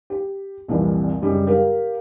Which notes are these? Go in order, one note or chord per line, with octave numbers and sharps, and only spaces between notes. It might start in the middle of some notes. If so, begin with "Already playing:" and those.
G4
C2 F2 A#2 E3 G3
F#2 C#3 G3 G#3
G4 A#4 F5